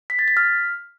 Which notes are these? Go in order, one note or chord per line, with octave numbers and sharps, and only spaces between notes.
B6
A6
B6
F6